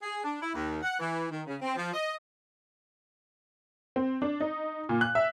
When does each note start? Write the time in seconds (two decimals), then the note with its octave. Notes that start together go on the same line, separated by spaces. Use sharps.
0.03 G#4
0.24 D4
0.42 E4
0.55 D#2
0.83 F#5
1.00 E3
1.31 D#3
1.47 C#3
1.62 C4
1.76 F3
1.94 D#5
3.96 C4
4.22 D4
4.40 D#4
4.89 A#2
5.01 F#6
5.15 E5